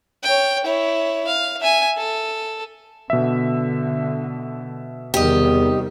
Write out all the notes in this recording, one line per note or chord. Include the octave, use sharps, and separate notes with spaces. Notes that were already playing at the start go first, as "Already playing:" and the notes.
C#5 G5
E4 C#5
F5
E5 G#5
A4
B2 D3 E5
E2 C3 D#3 G3 G4 D#5